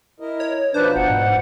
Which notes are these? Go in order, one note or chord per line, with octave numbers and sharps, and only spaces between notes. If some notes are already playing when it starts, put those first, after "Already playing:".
E4 A#4 D#5
C#5
B2 F3 D4 D#4 B4 C5 F#6
F#1 F#5
G#2